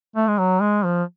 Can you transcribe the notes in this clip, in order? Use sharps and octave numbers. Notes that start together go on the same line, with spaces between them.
A3
G#3
F#3
G#3
F3